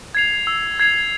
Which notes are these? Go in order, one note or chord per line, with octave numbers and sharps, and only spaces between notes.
G#6 C7 F7
E6
G#6 C7 F7